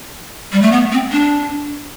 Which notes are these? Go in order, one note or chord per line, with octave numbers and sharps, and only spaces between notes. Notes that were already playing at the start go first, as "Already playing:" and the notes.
G3
A3
B3
C4
D4